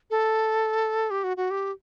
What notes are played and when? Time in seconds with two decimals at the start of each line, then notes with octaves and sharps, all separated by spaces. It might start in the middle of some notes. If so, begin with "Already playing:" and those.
0.11 A4
1.11 G4
1.24 F#4
1.37 F#4
1.51 G4